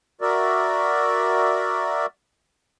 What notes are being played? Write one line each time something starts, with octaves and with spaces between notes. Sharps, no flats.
F#4 A#4 D5 E5